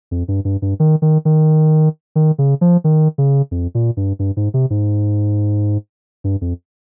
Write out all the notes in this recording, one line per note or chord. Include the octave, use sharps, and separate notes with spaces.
F2
G2
G2
G2
D#3
D#3
D#3
D#3
C#3
F3
D#3
C#3
F2
A#2
G2
G2
G#2
C3
G#2
G2
F2